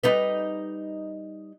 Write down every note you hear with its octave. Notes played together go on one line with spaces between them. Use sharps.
G3 D#4 B4